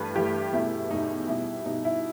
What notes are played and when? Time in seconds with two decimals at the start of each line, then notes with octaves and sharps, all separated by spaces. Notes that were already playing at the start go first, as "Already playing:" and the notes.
Already playing: G2 E3 A3 B4
0.15 G2 E3 A3 G4
0.53 E2 B2 A3 E4
0.90 E2 B2 A3 D#4
1.28 B2 G3 E4
1.66 B2 G3 D#4
1.85 E4